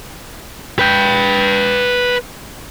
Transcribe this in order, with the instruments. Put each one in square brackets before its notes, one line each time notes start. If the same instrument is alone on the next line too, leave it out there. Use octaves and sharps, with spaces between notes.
[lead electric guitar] B4 G5